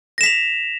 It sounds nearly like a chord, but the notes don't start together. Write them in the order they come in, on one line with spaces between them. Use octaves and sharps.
A#6 E7 B6 F7